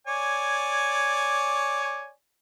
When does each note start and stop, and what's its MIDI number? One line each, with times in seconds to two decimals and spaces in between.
0.07 2.10 73
0.07 2.10 74
0.07 2.10 80